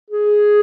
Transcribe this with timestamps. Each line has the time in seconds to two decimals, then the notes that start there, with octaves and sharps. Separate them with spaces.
0.10 G#4